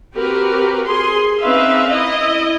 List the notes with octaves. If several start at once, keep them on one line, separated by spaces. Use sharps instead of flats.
C4 F#4 G4 A#4 B4
G#4 C6
C4 C#4 D#4 B4 E5 F5
E4 D#5